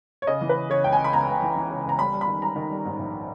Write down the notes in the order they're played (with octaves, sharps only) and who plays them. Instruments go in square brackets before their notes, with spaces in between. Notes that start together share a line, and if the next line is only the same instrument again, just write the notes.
[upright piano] C#5
C#3 D#5
E3
B4
C#3
C#3 C#5
C#2 G5
G#5
C#2
B5
C#2 A#5
C#2
E3
E3
C#3
C#2 A#5
G3 B5
G3
B5
D#3
G3 A#5
D#3
G3
G#2
A#1